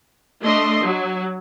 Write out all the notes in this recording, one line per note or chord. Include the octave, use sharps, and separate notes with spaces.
A3 D4 D#5 C6
F#3